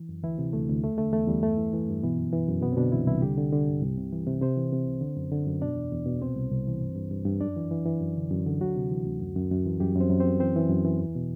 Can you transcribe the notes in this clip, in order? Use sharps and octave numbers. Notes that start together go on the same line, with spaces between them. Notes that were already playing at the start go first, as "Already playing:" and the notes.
Already playing: E3
F#2
D2 E3 E4
C3
D2 A3
D2
E2 A3
D3 A3
E2 A3
E2 G3
G2 A3
E3
E3
G2
B2 E3 B3
F#2
E3
F#2
C2 B2 B3
C4
B2 D3 D4
C2 E3 E4
C2 E3 E4
D3 G3 G4
D3
D3
G2
C2
C3
E3
C3
C3 C4 C5
E3
C3
C2
D3
F#2
D3
F#2
B2 D4 D5
E2
E2
B2
C2 C4 C5
C2
C2
E3
G2
G2
G2
G2
F#2 D4 D5
E3
E3
E3
F#2
D3
F#2
D3
D2 F#3 F#4
C3
E3
D2
F#2
F#2
F#2
E3
F#2 G3 G4
F#2
C4 C5
F#2
C4 C5
F#2
E3 C4 C5
E3
F#2
E3
E2
B2